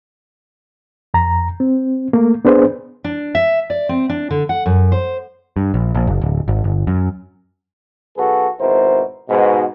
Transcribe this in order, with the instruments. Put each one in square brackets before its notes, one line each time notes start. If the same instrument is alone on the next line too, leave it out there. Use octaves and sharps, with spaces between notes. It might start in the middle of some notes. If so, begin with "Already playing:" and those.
[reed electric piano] F2 A#5
C4
A3 A#3
B3 D4 G#4 B4 C5
[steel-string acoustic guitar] D4
E5
D5
C4
D4
D3
F#5
F#2
C5
[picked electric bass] G2
A#1
A#1
F#1
D1
G#1
G1
F#2
[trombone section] B1 F#4 G#4 A4 B4
G#1 B2 E4 A#4 C5
G#2 B2